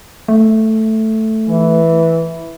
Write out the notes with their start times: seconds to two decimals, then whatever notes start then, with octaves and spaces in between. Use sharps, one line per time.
0.28 A3
1.49 E3